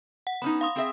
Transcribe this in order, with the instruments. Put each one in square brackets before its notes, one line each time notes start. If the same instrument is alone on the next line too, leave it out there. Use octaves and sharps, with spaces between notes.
[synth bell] F#5
[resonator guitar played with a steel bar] B3 C#4 D#4 [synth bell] B5
[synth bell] F5 C6 D#6
[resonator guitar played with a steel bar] C4 G#4 E5